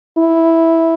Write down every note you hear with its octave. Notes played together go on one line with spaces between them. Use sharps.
E4